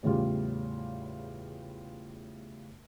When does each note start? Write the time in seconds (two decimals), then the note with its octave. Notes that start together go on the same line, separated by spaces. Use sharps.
0.03 E2 A2 C#3 G3 F4